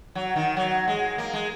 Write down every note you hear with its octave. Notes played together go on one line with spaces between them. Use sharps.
F#3
D#3
F#3
G#3
A#3
G#3